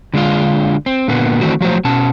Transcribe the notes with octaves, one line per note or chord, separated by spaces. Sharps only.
D3 G#3 D4 F4
C4
A#2 D3 A#3 B3
D#3 E3 A3 C4 D4 F#4
F3 F#3 A3 C5
B2 C#4 A5